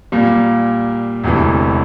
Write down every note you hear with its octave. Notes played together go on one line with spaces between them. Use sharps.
A#2 G3 A#3
E1 D2 C3 E3